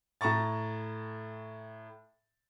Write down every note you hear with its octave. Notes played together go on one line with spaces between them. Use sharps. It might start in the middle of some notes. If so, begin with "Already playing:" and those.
A2 A5 A#5 C#6 A6